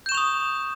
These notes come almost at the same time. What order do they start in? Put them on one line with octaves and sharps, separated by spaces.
G6 E7 C#6 F7 D#6